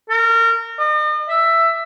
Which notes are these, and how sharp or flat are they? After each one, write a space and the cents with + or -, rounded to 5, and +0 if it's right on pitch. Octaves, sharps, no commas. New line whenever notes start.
A#4 -30
D#5 -45
E5 +10